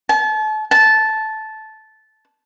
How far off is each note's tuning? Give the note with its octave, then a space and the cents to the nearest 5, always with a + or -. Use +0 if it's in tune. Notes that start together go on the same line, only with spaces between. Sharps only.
A5 -35
A5 -10